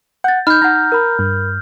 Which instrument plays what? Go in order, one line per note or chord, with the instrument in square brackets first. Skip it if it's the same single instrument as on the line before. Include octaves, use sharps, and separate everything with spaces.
[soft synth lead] F#5 [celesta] G6 A6
[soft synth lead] D#4 [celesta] B5 [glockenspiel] F6 G6
[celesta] D#4 F#5 [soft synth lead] A#5
[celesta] A#4 B5
[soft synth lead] G2